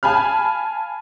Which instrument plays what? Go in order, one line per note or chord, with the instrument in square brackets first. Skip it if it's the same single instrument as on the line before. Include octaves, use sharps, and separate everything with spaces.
[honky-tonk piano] F5 G#5 A5 B5 F6